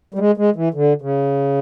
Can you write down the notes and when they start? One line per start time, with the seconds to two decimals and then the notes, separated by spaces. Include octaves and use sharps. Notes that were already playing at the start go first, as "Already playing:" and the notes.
0.14 G3
0.19 G#3
0.37 G#3
0.56 E3
0.74 D3
1.02 C#3